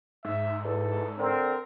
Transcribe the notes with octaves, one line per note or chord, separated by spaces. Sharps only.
G#2 E5
E2 A4
D3 C4 A#4